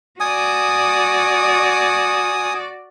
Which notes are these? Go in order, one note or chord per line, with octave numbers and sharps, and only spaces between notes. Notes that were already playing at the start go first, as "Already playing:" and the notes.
F#4 D5 G#5 D#6